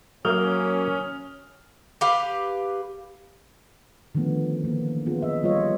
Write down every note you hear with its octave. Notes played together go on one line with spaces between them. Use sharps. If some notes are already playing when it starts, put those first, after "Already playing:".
F#3 A#3 C#4 A#4 E5 D#6 F6
G4 B4 F5
D3 D#3 F3 A3 B3 C#4
E3 A#3
B3 C#4 F4 G#4
D#5 E5
F3 G3 F4 B4 C#5 D#5